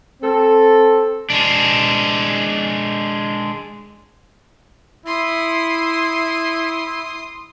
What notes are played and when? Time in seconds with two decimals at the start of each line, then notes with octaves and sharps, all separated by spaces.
0.22 C4 A4
1.30 G#3 D4
5.06 E4 C6 D#6